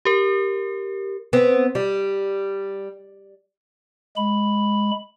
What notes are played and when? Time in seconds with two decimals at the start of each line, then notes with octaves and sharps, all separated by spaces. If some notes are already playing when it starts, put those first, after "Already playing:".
0.05 G4 A#4
1.33 B3 C4
1.75 G3
4.16 G#3 B5